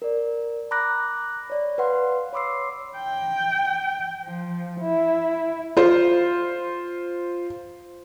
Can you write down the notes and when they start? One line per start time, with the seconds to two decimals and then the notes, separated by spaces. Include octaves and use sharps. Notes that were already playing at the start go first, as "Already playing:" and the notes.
0.02 A#4 D5
0.71 A#5 B5 D6 F#6 A#6
1.50 C#5 D5
1.78 B4 F5 F#5 C6
2.33 C#5 B5 C6 D6 E6 C7
2.98 G5
4.25 F3
4.81 E4
5.77 F4 C5